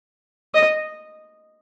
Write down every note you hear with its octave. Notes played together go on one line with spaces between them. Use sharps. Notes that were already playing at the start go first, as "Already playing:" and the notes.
D#5